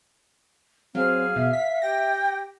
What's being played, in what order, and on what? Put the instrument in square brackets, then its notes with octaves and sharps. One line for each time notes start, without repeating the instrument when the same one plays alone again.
[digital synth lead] F#3 [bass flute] C4 [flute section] G#4 F6 [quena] F5
[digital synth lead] B2 [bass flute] E5
[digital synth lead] B6
[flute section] G4 [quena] G5 [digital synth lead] A#6